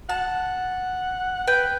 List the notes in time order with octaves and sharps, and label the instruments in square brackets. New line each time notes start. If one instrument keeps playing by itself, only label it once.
[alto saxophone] F#5 [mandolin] A5
[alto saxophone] B4 [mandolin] G5